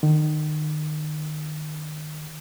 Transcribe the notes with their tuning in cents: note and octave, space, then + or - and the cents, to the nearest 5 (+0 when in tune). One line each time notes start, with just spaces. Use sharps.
D#3 -30